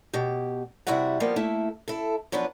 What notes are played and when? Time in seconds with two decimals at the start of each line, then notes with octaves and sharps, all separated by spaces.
0.13 B2 G4
0.87 C3 G3 E4 F#4 E5 F#5
1.20 F3 G3 A#3 B3
1.36 A3 A#3 E4 E5
1.88 E4 A4
2.32 F3 F#3 B3 D4 B4